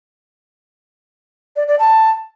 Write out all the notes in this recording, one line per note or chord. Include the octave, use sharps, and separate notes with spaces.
D5
D5
A5